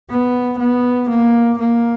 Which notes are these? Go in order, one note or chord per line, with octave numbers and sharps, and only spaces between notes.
B3
B3
A#3
A#3